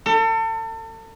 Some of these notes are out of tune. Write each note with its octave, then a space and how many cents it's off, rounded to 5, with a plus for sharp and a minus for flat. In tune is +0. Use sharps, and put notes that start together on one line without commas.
A4 +35